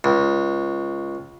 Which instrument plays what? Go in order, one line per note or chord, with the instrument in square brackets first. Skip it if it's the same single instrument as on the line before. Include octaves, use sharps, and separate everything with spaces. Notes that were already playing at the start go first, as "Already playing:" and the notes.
[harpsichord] C#2